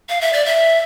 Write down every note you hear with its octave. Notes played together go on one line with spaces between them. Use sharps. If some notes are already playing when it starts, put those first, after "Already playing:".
F5
E5
D5
E5